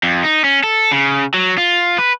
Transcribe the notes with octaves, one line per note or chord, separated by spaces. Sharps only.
F2
D#4
C#4
A4
C#3
F#3
F4
B4